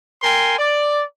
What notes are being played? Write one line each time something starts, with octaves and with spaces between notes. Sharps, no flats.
A#4 G5 G#5 C6
D5